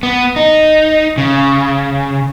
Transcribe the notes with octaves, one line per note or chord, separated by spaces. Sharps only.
B3
D#4
C#3